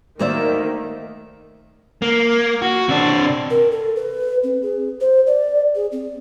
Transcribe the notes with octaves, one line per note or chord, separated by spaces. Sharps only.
D#2 D#3 A3 A#3 F#4 C5 D5 E5
A#3
F#4
C3 D4
A#4
A4
B4
C4
G#4
C5
D5
G#4
C4